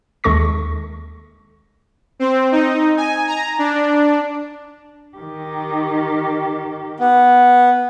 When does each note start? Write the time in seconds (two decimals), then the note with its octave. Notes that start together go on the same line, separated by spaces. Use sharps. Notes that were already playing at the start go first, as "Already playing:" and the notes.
0.24 D#2 G#3 A4 C#6 A#6
2.19 C4
2.52 D#4
2.97 G#5
3.27 A#5
3.59 D4
5.17 D#3 G4
7.00 B3